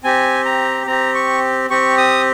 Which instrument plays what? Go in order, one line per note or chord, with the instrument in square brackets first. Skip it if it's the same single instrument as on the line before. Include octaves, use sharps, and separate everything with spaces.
[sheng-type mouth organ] C4 G4 G#5
A#5
C4 G4 A#5
C#6
C4 G4 C#6
D#6